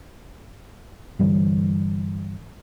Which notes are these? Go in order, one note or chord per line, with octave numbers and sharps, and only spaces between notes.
G2 D3 E3 G3